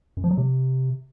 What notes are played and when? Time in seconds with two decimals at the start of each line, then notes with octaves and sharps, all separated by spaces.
0.17 F#2
0.24 F3
0.31 F#3
0.38 C3